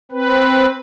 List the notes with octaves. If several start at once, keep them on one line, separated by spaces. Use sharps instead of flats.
C4 B4